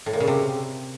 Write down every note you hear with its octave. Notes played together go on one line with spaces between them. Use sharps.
A2
A#2
C#3
C3